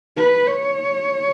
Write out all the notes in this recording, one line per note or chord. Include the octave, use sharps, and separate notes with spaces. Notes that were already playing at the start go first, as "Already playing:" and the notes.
B4
C#5